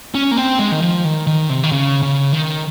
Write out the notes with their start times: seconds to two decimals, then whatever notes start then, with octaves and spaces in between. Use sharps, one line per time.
0.15 C#4
0.31 A#3
0.37 C4
0.59 G#3
0.72 D#3
0.82 F3
1.05 D#3
1.27 D#3
1.50 C3
1.63 D#3
1.72 C#3
2.03 C#3
2.32 D#3